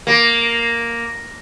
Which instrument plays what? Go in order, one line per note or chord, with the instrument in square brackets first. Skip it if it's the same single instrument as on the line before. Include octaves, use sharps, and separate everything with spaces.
[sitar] A#3